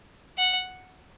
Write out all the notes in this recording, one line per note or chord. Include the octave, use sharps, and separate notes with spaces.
F#5